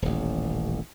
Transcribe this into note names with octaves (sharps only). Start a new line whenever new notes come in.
D#1 A1